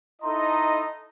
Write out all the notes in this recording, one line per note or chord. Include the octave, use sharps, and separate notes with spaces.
D#4 E4 A4 D#5 A#5 C6